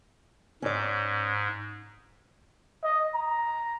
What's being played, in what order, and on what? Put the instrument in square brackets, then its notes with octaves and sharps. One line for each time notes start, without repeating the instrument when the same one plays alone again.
[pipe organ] G#2 [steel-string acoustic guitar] C#4 D5
[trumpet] D#5
A#5